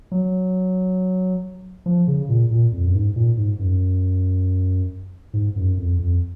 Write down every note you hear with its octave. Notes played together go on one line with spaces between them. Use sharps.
F#3
F3
C#3
A#2
A#2
F2
F#2
G#2
A#2
G#2
F#2
G#2
F#2
F2
F2